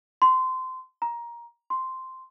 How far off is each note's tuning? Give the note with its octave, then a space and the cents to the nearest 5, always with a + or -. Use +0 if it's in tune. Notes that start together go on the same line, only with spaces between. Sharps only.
C6 -20
A#5 +15
C6 -5